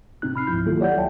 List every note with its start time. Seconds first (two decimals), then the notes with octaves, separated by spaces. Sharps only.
0.22 A2 C3 C4 D#4 F#6
0.36 B5 F6 C7
0.47 C#2 G#2 F3 E4 G6
0.66 D#3 F#3 A#3 E4 F4 A4
0.80 G4 C#5 D5 F#5 G6
0.96 D2 F#3 E5 G5 A5